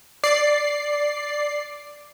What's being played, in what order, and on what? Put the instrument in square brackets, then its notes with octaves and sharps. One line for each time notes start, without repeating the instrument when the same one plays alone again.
[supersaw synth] D5 C7